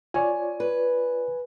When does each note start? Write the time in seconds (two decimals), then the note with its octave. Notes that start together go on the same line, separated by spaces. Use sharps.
0.14 F4 C#5 D5 G#5
0.60 B4